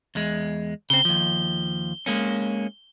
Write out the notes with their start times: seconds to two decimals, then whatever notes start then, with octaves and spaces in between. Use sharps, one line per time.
0.15 E2 G#3
0.90 C#3 C4 G7
1.05 D#2 F3
2.06 G#3 A#3 C#4